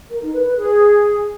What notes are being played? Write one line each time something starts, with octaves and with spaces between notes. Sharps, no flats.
A#4
D#4
B4
B4
G#4